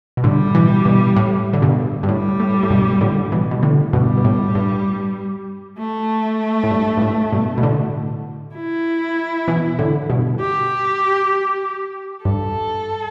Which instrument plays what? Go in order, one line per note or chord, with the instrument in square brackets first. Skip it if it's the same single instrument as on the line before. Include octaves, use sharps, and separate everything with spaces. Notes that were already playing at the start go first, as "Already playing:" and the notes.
[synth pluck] B2
[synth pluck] A2 D3 [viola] G3
[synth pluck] B2 E3
G2 B2
A2
D3
G2 B2
G2
[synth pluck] A2 [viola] G3
[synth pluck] A2
A2
G2 B2
A2 D3
B2 E3
B2
A2 D3
[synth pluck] G2 B2 [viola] G3
[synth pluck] B2
A2
G2
[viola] A3
[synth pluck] A2
G2
G2
A2
G2 B2
B2
A2 D3
[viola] E4
[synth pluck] B2 E3
A2 D3
G2 B2
[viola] G4
[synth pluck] G2 [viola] A4